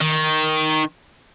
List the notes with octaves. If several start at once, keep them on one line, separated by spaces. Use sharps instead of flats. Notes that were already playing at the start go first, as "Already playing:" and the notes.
D#3